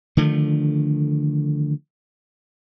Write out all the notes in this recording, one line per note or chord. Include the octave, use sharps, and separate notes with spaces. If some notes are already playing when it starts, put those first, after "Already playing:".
D3 D#3 F3 A3